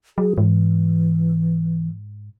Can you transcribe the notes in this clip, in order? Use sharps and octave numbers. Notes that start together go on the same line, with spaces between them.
F#3 G#4
G#2 E3